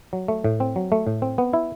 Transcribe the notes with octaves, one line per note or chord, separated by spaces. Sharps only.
F#3
A3
A2
C4
F#3
A3
A2
C4
B3
E4